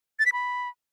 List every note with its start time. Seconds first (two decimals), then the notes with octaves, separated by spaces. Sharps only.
0.19 A6
0.26 B6
0.33 B5